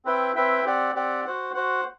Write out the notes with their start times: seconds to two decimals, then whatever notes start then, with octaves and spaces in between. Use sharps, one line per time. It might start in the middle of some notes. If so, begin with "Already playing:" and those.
0.05 C4 E4 B4 E5 G5
0.35 C4 E4 B4 E5 G5
0.64 C4 G4 D5 F#5
0.95 C4 G4 D5 F#5
1.25 F#4 C5 F#5
1.54 F#4 C5 F#5